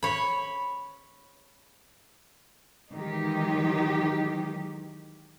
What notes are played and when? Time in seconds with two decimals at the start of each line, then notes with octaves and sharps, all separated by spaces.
0.03 C#5 B5
2.93 D#3 E3 F#3 G#3 D#4 G4